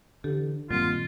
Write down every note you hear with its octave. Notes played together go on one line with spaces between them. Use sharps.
D3 E3 G4 A4
G2 A#2 D#3 F#3 C4 F4